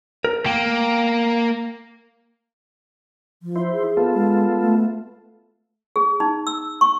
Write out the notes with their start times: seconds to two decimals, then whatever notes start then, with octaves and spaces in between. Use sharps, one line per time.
0.25 A#4
0.46 A#3 G5
3.43 F3
3.56 E4 C5
3.72 G#4
3.97 B3 F4 A4
4.14 G#3
4.60 A3
5.96 G#4
6.20 D#4
6.47 E6
6.81 C#6